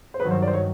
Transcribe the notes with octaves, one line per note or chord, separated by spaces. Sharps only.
C5
G2 D#3 F#3 B4
C5
D5
C5
C#5